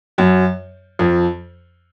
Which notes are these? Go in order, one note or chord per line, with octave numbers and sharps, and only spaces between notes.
F#2 F#3
F2 F3